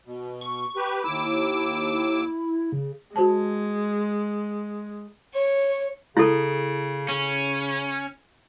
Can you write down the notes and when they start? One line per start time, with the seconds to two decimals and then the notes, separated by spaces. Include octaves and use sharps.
0.05 B2
0.41 C#6
0.76 G4 B4
1.04 D#2 E4 D6 E6
2.72 C#3
3.16 G#3 F#4 C5 A5
5.34 C#5
6.17 C#3 E4 A4
7.09 C#3 C#4